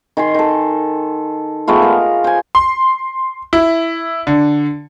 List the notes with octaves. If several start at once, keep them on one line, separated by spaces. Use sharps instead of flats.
D#3 G#5 C6
D#3 A4
G#3 A3 B3 F4
A#4
C5 G#5
C6
E4
D3